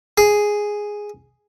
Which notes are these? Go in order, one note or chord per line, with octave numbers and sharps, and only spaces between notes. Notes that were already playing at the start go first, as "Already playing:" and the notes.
G#4